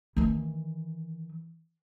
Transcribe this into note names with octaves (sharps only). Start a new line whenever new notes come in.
D#3 E3